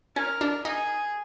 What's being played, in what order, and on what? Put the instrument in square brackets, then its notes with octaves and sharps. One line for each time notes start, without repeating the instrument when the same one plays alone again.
[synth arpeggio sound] C#4 [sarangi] A#4
[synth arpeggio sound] D4
[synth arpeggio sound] D#4 [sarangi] G#4